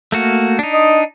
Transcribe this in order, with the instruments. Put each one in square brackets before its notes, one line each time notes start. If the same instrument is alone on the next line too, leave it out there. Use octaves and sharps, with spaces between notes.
[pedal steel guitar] A3 A#3 F#4
D4 D#4
[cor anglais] D#5